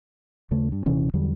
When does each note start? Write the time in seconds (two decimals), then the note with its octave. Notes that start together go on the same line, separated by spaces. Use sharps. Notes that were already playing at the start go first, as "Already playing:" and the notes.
0.51 D#2 C#3 A3
0.72 G2
0.86 D#1 C3 E3 C#4
1.14 E2 D3 F#3 G3